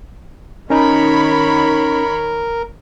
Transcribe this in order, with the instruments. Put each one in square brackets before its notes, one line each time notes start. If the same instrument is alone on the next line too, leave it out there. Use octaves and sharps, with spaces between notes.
[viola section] D#3 C#5 B5 [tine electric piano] C#4 D#4 [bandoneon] A#4